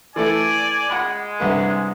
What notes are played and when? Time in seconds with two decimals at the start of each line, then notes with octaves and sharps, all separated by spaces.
0.16 E3 A3 A4 D5 G#5
0.90 G#3 F#5 B5
1.40 C2 D3 B4